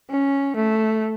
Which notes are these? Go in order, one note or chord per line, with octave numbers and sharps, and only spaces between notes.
C#4
A3